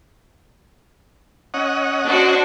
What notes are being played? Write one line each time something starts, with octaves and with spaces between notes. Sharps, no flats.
C#4 D#5 F#5
D4 F#4 C5